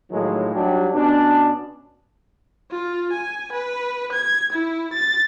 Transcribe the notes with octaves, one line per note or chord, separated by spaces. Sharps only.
A2 D#3 F3 F#3 G#3
F#3 G3 D4 D#4 G4
B2 C#4 D4
F4
G#5
B4
G#6
E4
A6